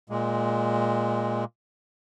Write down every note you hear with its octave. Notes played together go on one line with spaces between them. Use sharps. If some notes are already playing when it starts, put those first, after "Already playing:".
A#2 G#3